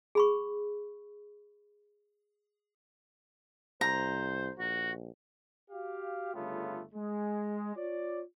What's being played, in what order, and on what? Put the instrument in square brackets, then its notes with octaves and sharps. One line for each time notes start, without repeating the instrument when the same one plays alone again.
[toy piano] G#4 B5 C#6
[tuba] C2 [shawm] C5 [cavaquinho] A#5
[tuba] A#1 [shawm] F#4
[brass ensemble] F#4 G4 F5
G1 C#3 A3 B3 F4
G#3
F4 C#5 D5